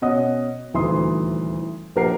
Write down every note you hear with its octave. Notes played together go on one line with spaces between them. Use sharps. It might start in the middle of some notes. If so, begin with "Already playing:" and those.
B2 C#4 D#5 F#5 D#6
D#1 D2 E3 D#4 C6 D#6
A#1 G4 A#4 F#5 C7